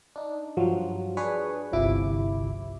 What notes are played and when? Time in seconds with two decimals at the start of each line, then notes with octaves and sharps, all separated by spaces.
0.16 D4 D#4
0.57 G2 F3 F#3
1.17 D4 G#4 B4 C#5
1.72 G1 C2 C3 F3 E4 D6